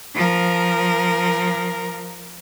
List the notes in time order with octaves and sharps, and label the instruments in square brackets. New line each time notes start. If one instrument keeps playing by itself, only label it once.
[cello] F3 A#4